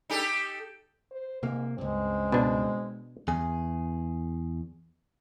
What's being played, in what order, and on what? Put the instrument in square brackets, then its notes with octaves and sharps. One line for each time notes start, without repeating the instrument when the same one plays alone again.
[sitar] D#4 G4 A4
[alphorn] C5
[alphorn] G#2 [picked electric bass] C3 A#3
[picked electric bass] C#2 G2 [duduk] G#3 [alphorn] C4
[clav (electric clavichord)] B2 D4
[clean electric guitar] E2 G#4